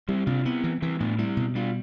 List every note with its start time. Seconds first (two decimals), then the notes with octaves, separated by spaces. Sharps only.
0.09 G3 C4 E4
0.27 C3 D4 F4
0.45 B3 C4 E4
0.64 E3
0.82 E3 C4 E4
1.00 A2 B3 D4
1.19 G3 C4 E4
1.37 B2
1.55 G3 D4 F4